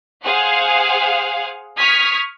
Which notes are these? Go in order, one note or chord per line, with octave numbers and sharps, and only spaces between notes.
G#4 C5 F5 F#5
C#6 D#6 F6 G#6 B6